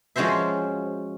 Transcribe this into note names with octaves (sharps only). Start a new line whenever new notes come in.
F3 G#3 C#4 F#4 C5 E5